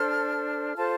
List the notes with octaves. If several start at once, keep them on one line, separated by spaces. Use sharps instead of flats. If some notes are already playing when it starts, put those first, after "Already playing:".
Already playing: D4 A4 C5 F6
F4 A4 C5 A5